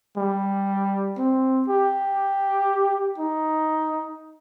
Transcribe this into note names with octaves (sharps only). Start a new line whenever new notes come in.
G3
C4
G4
D#4